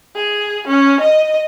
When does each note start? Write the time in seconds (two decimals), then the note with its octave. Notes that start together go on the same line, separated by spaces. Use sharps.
0.15 G#4
0.67 C#4
1.01 D#5